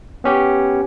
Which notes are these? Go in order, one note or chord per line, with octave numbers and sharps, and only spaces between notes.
B3 C#4 G4